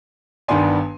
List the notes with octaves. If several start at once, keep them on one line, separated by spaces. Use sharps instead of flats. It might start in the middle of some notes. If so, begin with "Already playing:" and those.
G1 G2 D#3 B3 D4 G#5 C6